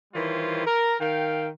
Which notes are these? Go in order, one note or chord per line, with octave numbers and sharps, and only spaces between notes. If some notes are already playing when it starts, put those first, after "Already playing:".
D#3 E3 G3 F4 C5 C#5
A#4
D#3 F5 G5